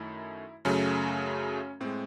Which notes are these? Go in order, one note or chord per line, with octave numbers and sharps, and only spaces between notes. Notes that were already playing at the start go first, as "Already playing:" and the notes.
Already playing: F#2 D#3 A3 E4
F#2 C#3 F#3 A3 C#4
A2 G#3 C4